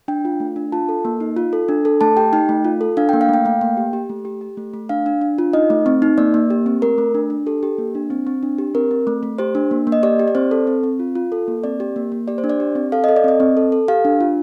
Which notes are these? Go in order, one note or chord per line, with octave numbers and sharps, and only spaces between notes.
D4 G5
F4
A3
D4
F4 A5
A4
A#3
D#4
F4
A4
D4
A4
A3 A5
G4 G5
D#4 G5
A3
F4
A4
D4 F5
A#3 G5
F5
A3 G5
A3 F5
A#3 G5
G4
G4
A3
G4
G4
A3
A3
D4 F5
D4
D4
F4
D#4 D#5
A3
C4
D#4
A#3 D5
A#3
G4
C4
A3 A#4
A3
D4
D4
G4 A4
G4
A#3
D4
C4
C4
D4
G4
C4 A#4
C4
A3
A3
G4 C5
D4
A#3
A#3
D#5
G4 D5
G4
D5
C4 C5
A4
C4
C4
F4
F4
A4
A#3
C4 D5
G4
A#3
A#3
G4 D5
C5
D4
D5
G4
C4
A4 F5
A4 D#5
D5
C4 D#5
C4
A4
A4
G4 F5
D4
F4